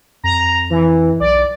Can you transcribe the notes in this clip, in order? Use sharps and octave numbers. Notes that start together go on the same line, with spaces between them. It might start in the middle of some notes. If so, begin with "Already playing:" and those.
F2 A#5
E3
B1 D5